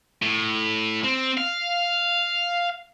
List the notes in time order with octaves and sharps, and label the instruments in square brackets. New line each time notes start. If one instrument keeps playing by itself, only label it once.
[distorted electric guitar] A2
C4
F5